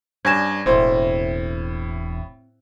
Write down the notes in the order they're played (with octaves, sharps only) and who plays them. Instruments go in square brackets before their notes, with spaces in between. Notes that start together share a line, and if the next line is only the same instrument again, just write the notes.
[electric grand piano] G2 G#5 [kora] C#4 D5 [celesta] G#6 A#6 E7
[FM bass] E1 [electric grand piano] A2 E4 [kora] C4